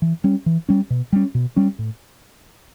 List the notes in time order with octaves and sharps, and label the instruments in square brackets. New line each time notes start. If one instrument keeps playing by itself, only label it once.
[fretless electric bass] E3
G3 C#4
E3
G3 C#4
B2
G3 C#4
B2
G3 C#4
A2